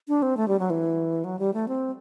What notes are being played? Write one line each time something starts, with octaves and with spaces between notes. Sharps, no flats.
D4
C4
A3
G3
F#3
E3
F#3
G3
A3
C4